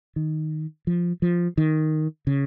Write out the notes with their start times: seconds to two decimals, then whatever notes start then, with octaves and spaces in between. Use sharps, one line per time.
0.16 D#3
0.87 F3
1.22 F3
1.57 D#3
2.27 C#3